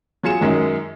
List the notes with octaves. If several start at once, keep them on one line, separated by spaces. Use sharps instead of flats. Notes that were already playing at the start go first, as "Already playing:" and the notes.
F#3 F4 G#4 C#7 E7
F#2 D#3 F#3 G#3